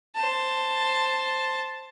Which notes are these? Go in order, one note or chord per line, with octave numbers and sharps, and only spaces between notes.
C5 A5